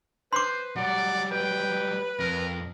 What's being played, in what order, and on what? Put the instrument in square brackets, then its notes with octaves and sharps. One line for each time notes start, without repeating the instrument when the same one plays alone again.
[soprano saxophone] B4 [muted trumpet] C5 [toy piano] C6 D6
[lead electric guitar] F#3 G3 [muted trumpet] D5 [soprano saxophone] F#5
[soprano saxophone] B4 [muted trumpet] G5
[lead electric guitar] F2 [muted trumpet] A#4